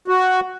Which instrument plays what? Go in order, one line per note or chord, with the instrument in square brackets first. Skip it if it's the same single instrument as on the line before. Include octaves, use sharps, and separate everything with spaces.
[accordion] F#4